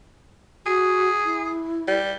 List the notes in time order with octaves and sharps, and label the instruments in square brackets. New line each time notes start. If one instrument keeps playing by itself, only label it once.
[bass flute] F#4 [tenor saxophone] G#4
[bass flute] E4
[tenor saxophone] G3